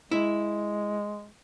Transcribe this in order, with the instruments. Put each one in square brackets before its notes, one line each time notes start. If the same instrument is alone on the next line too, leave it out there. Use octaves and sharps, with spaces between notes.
[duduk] G#3 [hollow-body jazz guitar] E4